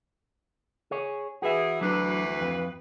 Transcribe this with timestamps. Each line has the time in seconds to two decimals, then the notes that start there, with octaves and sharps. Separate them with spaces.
0.91 G#4 C#5
1.42 E3 F#4 G#4 E5
1.81 D2 E3 F#3 D4 B4
2.41 F2